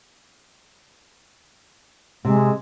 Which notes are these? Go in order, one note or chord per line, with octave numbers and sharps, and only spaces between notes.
C3 G#3